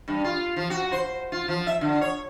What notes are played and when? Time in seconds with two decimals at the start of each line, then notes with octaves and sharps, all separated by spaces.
0.08 G2
0.24 F4
0.56 F3
0.70 F#4
0.92 C5
1.32 F4
1.48 F3
1.67 E5
1.81 D3
2.01 C#5